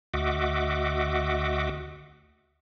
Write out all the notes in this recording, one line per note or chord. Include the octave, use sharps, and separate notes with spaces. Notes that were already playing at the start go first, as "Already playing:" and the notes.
D2 F#4 D#5 E5 F#5 D6